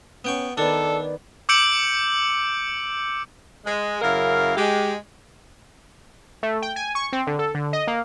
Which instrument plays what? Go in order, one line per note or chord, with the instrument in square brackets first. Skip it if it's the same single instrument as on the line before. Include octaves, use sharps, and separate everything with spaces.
[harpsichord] B3 G5 C#6 [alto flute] C#4
[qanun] D#3 B3 [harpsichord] D4 [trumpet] A4 [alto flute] D5
[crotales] D6 E6 G6 C#7 D7 F#7
[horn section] G#3
F#2 C#3 E4 A#4 F5
G#3 G4
[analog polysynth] A3
G5
G#5
C#6
C4
D3
A4
D3
D#5
A#3